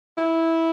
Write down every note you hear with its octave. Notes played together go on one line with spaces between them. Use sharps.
E4